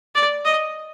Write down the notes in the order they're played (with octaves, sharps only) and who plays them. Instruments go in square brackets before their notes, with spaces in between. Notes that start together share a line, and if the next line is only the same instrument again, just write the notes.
[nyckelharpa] D5
D#5